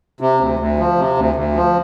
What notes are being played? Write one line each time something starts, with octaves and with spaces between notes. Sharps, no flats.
C3
D2
D2
F3
C3
D2
D2
F3